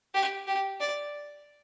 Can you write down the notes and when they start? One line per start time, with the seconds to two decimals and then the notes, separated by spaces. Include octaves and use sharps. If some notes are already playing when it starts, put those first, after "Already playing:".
0.15 G4
0.47 G4
0.81 D5